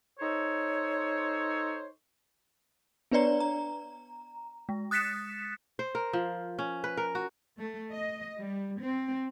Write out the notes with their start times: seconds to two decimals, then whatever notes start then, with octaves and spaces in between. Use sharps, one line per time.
0.19 D#4 A4 C5 C#5
3.11 B3 D4 B4 C#5 D5 A#5
3.40 A#5
4.69 G#3
4.91 D#6 F#6 A6 B6 C#7 E7
5.79 C5
5.95 A#4
6.13 F3
6.59 C#4
6.84 B4
6.97 A#4
7.15 F#4
7.58 A3
7.92 D#5
8.38 G3
8.79 C4